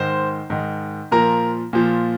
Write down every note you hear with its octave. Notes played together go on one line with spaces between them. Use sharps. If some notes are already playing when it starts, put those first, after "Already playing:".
Already playing: G#2 D#3 C5 C6
G#2 D#3
A#2 F3 A#4 A#5
A#2 F3